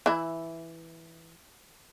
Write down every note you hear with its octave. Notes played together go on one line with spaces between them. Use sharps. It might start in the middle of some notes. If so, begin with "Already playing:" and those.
E3 E4